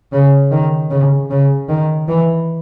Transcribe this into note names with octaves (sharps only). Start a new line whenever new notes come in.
C#3
D#3
C#3
C#3
D#3
E3